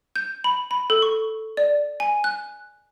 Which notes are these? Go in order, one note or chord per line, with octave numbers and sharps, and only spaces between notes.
G6
B5
B5
A4
C#6
D5
G#5
F#6